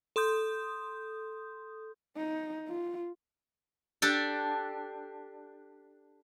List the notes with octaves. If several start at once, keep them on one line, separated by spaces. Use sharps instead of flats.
A4 C6 D#6 G6
D#4
F4
D4 G4 A4